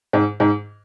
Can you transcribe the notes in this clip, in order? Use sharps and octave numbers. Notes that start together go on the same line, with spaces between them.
G#2
G#2